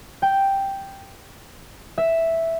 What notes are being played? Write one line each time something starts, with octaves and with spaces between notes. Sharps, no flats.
G5
E5